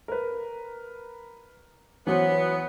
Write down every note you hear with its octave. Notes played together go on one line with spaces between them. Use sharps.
A#4 B4
E3 F#3 B3 C5 C#5